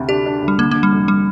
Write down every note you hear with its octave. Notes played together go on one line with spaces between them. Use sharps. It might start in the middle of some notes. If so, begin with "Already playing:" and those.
Already playing: D2 C3
D4 G4
D4
D2
G3
D3 A#3
D3 A#3
G3
F1
G3